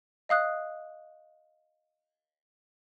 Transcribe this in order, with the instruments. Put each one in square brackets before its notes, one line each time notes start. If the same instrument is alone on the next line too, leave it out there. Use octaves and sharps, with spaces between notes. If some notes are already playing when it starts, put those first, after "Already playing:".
[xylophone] D#5 F5 D#6 F#6